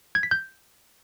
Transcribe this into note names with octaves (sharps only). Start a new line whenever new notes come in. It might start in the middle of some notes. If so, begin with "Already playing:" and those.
G#6
B6
G6